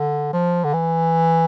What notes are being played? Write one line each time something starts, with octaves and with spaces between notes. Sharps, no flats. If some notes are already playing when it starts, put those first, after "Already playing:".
Already playing: D3
F3
D3
E3